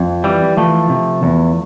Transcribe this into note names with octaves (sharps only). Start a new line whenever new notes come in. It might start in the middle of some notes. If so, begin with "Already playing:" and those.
Already playing: F2
E3 G3
E3 F3 A3
C3
E2